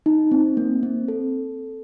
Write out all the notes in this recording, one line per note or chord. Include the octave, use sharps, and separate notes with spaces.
D#4
C4
A#3
C4
A4